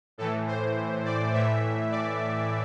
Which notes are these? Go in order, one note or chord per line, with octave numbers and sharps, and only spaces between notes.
A2 E3 A4
C5
D5
A2 E3 E5
D5